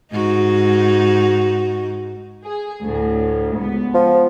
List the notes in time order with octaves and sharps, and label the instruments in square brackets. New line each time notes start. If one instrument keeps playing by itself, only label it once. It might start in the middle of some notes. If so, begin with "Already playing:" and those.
[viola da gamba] G#2 D#4 F#4
[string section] G#4
D2 A2
C#2 B3
[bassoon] F3